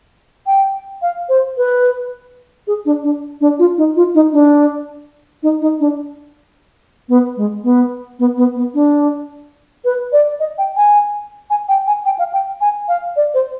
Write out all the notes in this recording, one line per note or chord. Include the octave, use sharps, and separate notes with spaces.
G5
F5
C5
B4
G#4
D4
D4
D4
F4
D#4
F4
D#4
D4
D#4
D#4
D4
B3
G#3
B3
B3
B3
B3
D4
B4
D5
D#5
G5
G#5
G#5
G5
G#5
G5
F5
G5
G#5
F5
D5
C5